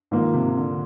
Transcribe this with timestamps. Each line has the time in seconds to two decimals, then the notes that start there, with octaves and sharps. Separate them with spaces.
0.11 G#2 D#3 F3 A#3
0.34 C3
0.57 D3